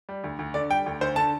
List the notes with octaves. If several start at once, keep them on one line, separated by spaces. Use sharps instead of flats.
G3
D2
D2
D3 D5
G3 G5
D2
D2 C5
D3 A5